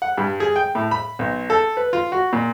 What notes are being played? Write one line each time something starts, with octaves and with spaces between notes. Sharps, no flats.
F#5
G2
G#4
G5
A2
B5
B1
A4
B4
F4
F#4
A#2